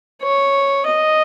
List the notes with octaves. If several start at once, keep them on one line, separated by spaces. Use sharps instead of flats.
C#5
D#5